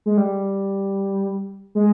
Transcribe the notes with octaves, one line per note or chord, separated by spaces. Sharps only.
G#3
G3
G#3